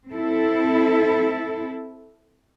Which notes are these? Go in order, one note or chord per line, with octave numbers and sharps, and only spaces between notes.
C4 E4 A4